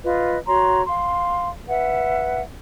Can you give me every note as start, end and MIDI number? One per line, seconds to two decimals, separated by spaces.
0.04 0.37 65
0.04 0.37 71
0.04 0.37 75
0.48 0.82 66
0.48 0.82 73
0.48 0.82 82
0.48 0.82 84
0.87 1.48 77
0.87 1.48 84
1.69 2.41 71
1.69 2.41 76
1.69 2.41 78